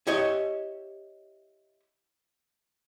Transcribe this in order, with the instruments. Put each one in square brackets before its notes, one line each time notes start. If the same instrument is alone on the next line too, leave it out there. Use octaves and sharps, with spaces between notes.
[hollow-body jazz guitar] E4 G4 C#5 D#5